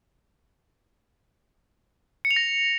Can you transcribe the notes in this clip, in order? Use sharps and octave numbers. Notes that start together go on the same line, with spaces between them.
C#7
F7
A#6